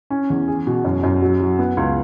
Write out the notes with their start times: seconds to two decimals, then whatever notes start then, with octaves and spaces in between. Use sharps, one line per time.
0.10 C#4
0.30 E2
0.48 G#4
0.67 B2
0.85 F#2
1.03 F#2
1.22 F#3
1.40 F#3
1.59 B3
1.77 C#2